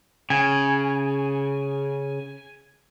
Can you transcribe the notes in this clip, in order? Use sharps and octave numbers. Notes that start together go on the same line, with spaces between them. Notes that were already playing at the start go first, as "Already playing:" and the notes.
C#3 G#5